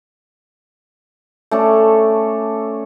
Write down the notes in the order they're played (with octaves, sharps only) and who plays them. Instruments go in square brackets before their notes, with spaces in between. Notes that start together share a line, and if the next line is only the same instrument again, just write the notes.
[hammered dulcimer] A3 C#4 A4 D5